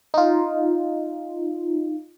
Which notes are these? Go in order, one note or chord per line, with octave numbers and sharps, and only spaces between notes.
D#4 F4